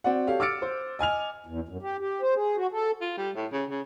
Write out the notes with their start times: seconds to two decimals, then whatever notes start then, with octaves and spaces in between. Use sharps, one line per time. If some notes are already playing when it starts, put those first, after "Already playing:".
0.04 C4 F#4 D5 F#5
0.27 G4 A4 C#5 F5
0.40 D6 E6 F6 A6 C#7 D7
0.62 C5
0.99 D#5 G#5 F6 F7
1.46 E2
1.69 F#2
1.82 G4
2.00 G4
2.22 C5
2.35 G#4
2.56 F#4
2.72 A4
3.01 F4
3.18 G3
3.36 A2
3.52 C#3
3.70 C#3